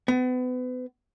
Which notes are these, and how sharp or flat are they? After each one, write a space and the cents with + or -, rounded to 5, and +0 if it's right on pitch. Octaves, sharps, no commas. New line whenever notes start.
B3 +35